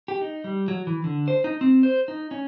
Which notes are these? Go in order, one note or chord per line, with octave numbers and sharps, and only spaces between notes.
G4
D#4
G3
F#3
E3
D3
C5
D#4
C4
C5
D#4
C#4